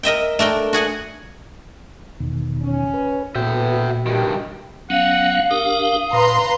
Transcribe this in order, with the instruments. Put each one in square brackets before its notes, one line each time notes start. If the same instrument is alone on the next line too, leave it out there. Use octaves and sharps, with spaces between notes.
[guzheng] A#4 D#5 E5 G5
A3 D4 A#4 G5
F#4 G#4 F#5 G#5
[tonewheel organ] E2 B2 D#3
[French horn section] C#4
[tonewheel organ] B4
[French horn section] E2 A3 B3 [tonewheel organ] A#2 F#4 [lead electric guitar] E5 G5
[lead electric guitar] G2 D#3 [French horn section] G4
[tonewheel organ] F#3 B3 C#4 [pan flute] F5 [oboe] F#5
[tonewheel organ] D4 G4 A#4 [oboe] D#6
[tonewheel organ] A#2 [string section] B4 A#5 C6